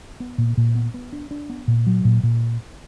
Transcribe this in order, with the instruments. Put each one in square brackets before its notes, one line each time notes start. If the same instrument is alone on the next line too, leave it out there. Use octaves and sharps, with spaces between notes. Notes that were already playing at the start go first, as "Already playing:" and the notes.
[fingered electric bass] B3
A#2
A#2
B3
B3
D4
D4
B3
A#2
F#3
A#2
A#2